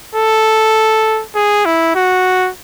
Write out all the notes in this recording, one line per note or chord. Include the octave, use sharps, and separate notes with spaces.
A4
G#4
E4
F#4